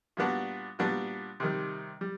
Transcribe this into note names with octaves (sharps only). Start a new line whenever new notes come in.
A#2 G3 B3 D4 F#4
A#2 G3 B3 D4 F#4
C3 D#3 G3
G3